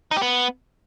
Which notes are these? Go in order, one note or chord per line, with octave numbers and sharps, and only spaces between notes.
D#4
G4
B3